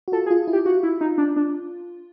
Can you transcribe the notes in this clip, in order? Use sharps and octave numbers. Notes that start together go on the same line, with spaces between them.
F#4
F4 A4
G#4
F4
E4
G4
F4 F#4
E4
D#4
D4
D4